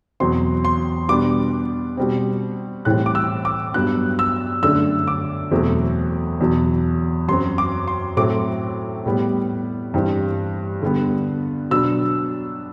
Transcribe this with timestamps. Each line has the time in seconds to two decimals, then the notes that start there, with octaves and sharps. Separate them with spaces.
0.20 E2 B2 F#3 C4 C6
0.65 C6
1.08 B2 G3 B3 D4 D6
1.97 B2 G3 C4
2.85 A2 E3 G3 C4 F#6
3.06 D6
3.15 E6
3.45 D6
3.74 G2 F#3 B3 D4 F#6
4.19 E6
4.63 F#2 D3 A3 D4 E6
5.07 D6
5.51 E2 B2 F#3 A3 C4
6.40 E2 B2 F#3
7.28 F#2 F#3 C4 C6
7.58 D6
7.88 C6
8.17 A2 F#3 A3 C4 D6
9.06 A2 G3 B3
9.94 G2 E3 G3 C4
10.82 D3 G3 B3
11.70 B2 F#3 B3 D4 E6